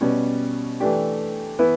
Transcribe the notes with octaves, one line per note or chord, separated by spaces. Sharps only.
B2 G3 C#4
E3 A3 D4 G4
E3 B3 E4 B4